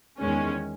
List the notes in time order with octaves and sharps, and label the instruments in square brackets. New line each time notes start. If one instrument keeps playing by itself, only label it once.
[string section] E2 D#3 G#3 C#4